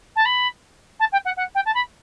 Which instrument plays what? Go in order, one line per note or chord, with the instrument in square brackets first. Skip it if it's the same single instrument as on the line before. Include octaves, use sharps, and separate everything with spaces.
[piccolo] A5
B5
A5
G5
F#5
F#5
G5
A5
B5